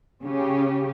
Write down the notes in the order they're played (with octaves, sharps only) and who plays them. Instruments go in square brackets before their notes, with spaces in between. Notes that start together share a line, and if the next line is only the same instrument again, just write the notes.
[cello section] C#3 C#4 G4